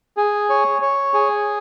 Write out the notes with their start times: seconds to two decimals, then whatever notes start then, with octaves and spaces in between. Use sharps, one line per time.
0.17 G#4
0.50 C#5
0.82 C#5
1.14 G#4